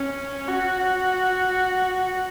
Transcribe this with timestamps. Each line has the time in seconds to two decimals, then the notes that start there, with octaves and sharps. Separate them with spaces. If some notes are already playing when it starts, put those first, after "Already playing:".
Already playing: C#4
0.48 F#4